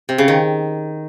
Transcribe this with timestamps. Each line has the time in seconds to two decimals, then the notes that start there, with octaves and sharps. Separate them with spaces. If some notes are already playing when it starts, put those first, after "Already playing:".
0.09 C3
0.18 C#3
0.28 D#3